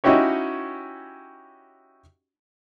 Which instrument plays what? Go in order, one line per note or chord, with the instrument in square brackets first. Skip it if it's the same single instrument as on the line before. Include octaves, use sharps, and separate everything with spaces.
[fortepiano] C#4 D#4 E4 F#4 G4 C#5